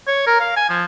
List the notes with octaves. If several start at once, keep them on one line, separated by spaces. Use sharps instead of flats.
C#5
A#4
F5
G#5
F3